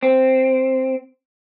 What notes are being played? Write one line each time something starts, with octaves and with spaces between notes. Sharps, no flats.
C4